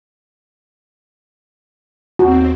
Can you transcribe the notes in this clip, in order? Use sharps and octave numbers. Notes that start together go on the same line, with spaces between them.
D#2 C4 F#4